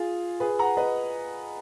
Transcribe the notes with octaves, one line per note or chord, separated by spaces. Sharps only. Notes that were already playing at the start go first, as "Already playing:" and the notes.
Already playing: F4 G#4
G#4 B4
F#5 A#5
B4 D#5